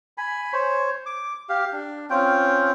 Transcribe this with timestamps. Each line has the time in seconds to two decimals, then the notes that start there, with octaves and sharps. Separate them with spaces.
0.18 G#5 B5
0.53 C5 C#5
1.06 D6
1.49 G4 F5
1.72 D4
2.10 C4 C#4 F4 G5